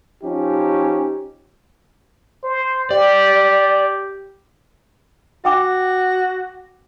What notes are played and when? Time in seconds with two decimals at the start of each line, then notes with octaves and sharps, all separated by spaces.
0.24 F3 C#4 D#4 G4
2.44 C5
2.91 G4 D5
5.45 F#4 G5 G#5 D6